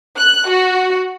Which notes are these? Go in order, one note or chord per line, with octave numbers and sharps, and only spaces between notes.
F#6
F#4